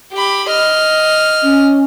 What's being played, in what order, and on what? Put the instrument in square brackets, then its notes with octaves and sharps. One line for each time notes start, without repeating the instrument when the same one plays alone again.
[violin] G4 B5
D#5 F6
[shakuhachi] C#4